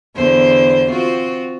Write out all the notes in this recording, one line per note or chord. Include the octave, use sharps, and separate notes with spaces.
E2 D3 C5
C4 F4 F#4